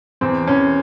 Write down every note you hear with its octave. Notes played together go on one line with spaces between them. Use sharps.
E2 C4
E2 C#4